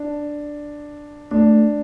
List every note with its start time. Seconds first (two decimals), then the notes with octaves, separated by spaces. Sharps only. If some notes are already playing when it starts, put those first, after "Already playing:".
Already playing: D4
1.31 A3 D4